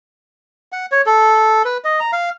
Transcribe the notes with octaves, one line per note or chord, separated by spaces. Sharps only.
F#5
C#5
A4
B4
D#5
A#5
F5